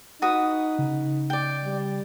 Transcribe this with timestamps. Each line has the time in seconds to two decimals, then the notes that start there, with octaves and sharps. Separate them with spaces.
0.22 D#4 F#4 B4 D#6
0.79 C#3
1.30 D5 G5
1.64 G3